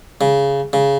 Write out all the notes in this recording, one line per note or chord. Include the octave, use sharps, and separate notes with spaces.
C#3
C#3